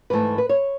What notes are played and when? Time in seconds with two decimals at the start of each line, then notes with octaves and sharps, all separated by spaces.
0.10 G#2 E3 A3 B4
0.38 B4
0.49 C#5